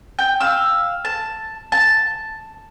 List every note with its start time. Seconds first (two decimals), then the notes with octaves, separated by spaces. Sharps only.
0.19 G5
0.40 F5 E6
1.05 A5
1.72 A5